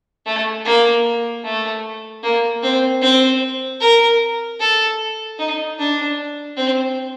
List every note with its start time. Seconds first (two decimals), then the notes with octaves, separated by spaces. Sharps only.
0.26 A3
0.65 A#3
1.44 A3
2.23 A#3
2.62 C4
3.02 C4
3.81 A#4
4.60 A4
5.39 D#4
5.79 D4
6.57 C4